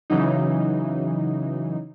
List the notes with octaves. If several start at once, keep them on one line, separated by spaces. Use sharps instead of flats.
C#3 E3 F#3 D#4